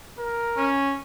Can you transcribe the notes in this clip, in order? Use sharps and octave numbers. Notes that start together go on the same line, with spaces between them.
A#4
C#4